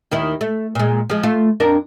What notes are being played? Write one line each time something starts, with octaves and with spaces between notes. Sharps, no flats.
D#2 D#3 E4
A3
A#2 G#3
F3 G#3
A3 F4
F2 D4 A#4